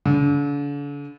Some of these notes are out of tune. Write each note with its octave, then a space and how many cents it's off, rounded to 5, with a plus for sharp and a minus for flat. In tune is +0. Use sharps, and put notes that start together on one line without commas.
D3 -40